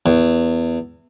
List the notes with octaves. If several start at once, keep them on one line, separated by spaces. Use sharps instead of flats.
E2